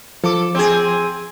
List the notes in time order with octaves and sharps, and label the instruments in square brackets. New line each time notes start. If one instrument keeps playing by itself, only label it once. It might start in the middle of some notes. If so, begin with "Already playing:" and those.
[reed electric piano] F3 D6 [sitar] A4
[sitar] C4 G#4